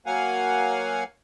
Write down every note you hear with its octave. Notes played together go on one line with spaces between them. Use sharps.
F#3 A#3 F5 F#5 G#5